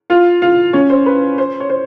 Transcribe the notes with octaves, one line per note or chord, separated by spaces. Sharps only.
F4 F5
F4 F5
C#4 C#5
C5
B4
C5
C#5
C5